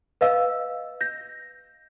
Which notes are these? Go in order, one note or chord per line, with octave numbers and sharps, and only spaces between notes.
B4 D#5 F5 E6
G6 A#6